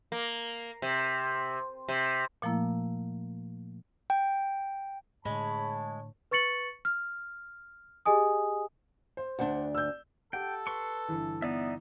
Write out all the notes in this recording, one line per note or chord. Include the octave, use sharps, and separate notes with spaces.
A#3
C3
C3
A#2 F3 A3 A#3 E4
G5
A2 D3 G#3 C#5 A5 B5
B4 C#6 A6 C#7 F#7
F6
G4 G#4 D#5 G#5 D#6
C5
D2 D4 C5 F#5
E6 G6
G4 A4 F#5 G5
B4 C6 C#6
G1 E3
B3 D#4 D5 E5